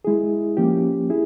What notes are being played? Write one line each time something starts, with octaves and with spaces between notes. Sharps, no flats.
G#3 E4 G#4
F3 A#3 C#4 G4
E4 G#4